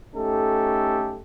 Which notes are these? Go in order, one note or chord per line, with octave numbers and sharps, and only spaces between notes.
A3 C#4 D#4 G4 A4